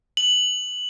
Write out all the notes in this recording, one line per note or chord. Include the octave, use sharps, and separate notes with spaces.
F#7